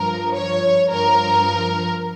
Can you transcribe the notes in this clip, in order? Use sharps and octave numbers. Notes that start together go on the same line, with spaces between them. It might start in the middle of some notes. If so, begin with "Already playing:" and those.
Already playing: G2 F3 A#4
C#5
G2 F3 A#4